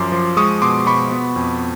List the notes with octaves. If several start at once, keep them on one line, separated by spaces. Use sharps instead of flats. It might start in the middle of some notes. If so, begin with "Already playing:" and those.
Already playing: F#2 F3 C6 D6
F3
G#3 C#6 D#6
B2 C6 D6
B2 B5 C#6
B3
F2